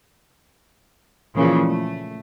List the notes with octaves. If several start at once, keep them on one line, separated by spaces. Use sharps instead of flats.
A#2 C#3 E3 F3 A#3
A3